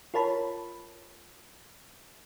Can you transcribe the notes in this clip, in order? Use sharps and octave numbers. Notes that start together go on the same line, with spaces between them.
F4 A#4 C#5 A5 B5